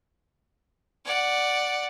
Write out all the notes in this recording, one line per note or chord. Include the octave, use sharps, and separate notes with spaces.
D5 F#5